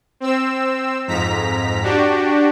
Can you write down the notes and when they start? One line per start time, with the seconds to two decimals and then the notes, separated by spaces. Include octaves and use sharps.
0.20 C4 E6
1.07 F2 G#2 A#5 B6
1.83 D4 F#4 G4